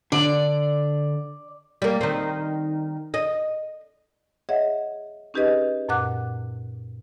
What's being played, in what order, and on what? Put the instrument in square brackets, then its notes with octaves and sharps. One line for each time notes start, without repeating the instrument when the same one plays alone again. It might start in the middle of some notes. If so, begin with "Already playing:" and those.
[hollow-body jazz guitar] D3 D4 [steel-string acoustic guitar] D5
[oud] G3 A#3
D#3 C4
D#5
[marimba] G#4 C#5 D#5 E5 F#5
C#4 D#4 G4 G#4 B4 D#5
F#2 A#2 F#5 D6 F#6